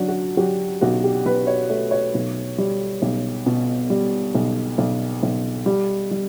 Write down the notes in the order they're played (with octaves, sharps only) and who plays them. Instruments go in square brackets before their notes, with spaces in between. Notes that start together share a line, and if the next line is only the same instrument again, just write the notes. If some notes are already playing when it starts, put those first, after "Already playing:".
Already playing: [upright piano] F#3 D4
F#4
F#3 G4
B1 F#4
G4
B1 B4
C#5
A3 C#5
C#5
B1
G3
B1
B2
G3
B1
B1
B1
G3
G3